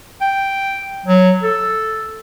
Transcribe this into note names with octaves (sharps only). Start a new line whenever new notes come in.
G5
F#3
A4